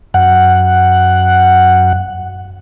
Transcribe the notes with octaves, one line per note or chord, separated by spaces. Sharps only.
F#2 F#5